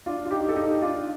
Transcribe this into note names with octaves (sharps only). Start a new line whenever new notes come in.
D4 F4
F4
D#4 G4
A4
D#4 G4
D4 F4